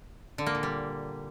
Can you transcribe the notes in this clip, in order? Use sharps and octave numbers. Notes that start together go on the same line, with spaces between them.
D3
A#3
A#2
G3